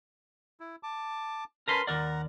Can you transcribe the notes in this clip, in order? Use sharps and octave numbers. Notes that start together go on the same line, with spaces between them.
E4
A5 D6
C#4 A#4 B4 A5 B5 C6
D#2 A#4 D5 F#5 A#5